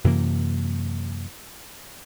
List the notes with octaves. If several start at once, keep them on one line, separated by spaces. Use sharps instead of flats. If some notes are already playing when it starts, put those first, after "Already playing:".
F#2 C3 E3 A#3